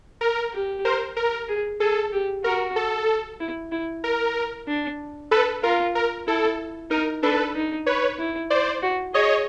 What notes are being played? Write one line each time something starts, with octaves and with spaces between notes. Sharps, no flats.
A#4
G4
A#4 C5
A#4
G#4
G#4 A4
G4
F#4 A#4
A4
E4
E4
A#4
D4
A4 B4
F4 A#4
A#4
E4 A4
D#4 A#4
D4 A4 B4
D#4
B4 C#5
E4
C5 D5
F#4
G#4 C#5 D#5